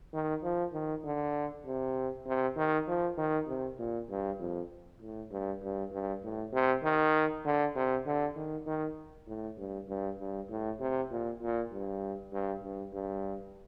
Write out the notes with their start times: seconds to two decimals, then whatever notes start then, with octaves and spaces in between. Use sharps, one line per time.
0.14 D#3
0.43 F3
0.73 D#3
1.04 D3
1.66 C3
2.26 C3
2.57 D#3
2.88 F3
3.17 D#3
3.48 C3
3.79 A#2
4.10 G2
4.40 F2
5.01 A2
5.31 G2
5.63 G2
5.92 G2
6.24 A2
6.53 C3
6.84 D#3
7.45 D3
7.76 C3
8.06 D3
8.36 D#3
8.67 D#3
9.27 A2
9.58 G2
9.89 G2
10.19 G2
10.50 A2
10.80 C3
11.11 A#2
11.42 A#2
11.72 G2
12.33 G2
12.63 G2
12.93 G2